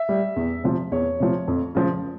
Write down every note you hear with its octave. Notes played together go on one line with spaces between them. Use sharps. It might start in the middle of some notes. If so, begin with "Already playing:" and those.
Already playing: E5
G3
E2
C3 F3
E2 C#5
C3 F3
F2
C#3 F3